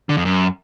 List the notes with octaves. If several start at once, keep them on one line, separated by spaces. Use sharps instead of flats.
D3
F2
F#2